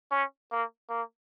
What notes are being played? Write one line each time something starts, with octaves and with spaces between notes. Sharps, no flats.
C#4
A#3
A#3